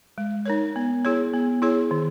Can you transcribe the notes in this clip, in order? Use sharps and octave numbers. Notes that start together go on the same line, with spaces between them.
G#3
D#4 A#4 C#5
B3
E4 G#4 C#5
B3
E4 G#4 C#5
D#3